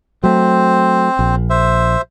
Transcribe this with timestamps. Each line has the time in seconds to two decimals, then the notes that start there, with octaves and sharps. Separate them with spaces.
0.23 F#3 A3 C4 C5
1.19 A#1
1.50 C5 E5